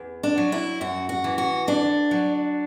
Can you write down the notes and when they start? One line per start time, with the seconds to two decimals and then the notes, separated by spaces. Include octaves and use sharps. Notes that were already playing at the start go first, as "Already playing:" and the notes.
Already playing: E2
0.23 D4
0.38 F#3
0.52 E4
0.81 F#2 F#4
1.09 F#4
1.24 E3
1.38 F#4
1.67 D2 D4
2.11 F#3